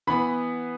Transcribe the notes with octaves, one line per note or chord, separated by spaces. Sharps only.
E3 B3 B5